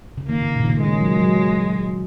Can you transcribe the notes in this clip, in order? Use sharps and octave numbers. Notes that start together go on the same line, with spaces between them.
C#3
D#3 A#3
C#3
A#2
D#3
C#3
D#3 G#3
F#3
F#3